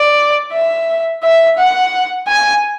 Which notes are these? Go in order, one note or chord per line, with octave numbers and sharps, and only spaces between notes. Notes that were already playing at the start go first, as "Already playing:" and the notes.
Already playing: D5
E5
E5
F#5
G#5